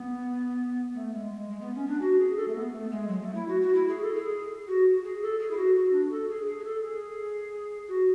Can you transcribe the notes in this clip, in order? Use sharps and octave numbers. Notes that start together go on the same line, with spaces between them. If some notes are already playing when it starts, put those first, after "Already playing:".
Already playing: B3
A3
G#3
G#3
G#3
B3
C#4
D4
F#4
G#4
A4
A3
B3
A3
G#3
F#3
A3
E4
F#4
F#4
E4
G#4
A4
G#4
F#4
F#4
G#4
A4
G#4
E4
F#4
F#4
D4
A4
G#4
G#4
G#4
A4
G#4
F#4